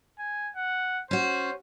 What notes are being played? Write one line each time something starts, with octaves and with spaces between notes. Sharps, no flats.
G#5
F#5
C#4 F#4 C5